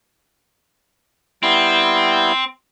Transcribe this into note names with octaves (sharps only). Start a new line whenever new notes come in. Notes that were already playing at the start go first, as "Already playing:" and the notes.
G3 B3 C4 E4